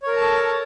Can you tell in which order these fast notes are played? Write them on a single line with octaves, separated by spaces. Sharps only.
C#5 A#4 A#5 A5 A4